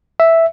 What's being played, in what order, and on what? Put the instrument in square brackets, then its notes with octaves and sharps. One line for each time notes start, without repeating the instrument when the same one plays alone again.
[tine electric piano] E5